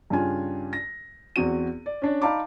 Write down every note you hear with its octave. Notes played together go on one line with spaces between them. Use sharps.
G2 C#3 D4 F4 G#5
A#6
E2 C4 F#4 D#7
D5
C#4 D4 D5
D#4 D5 F5 A5 B5 D6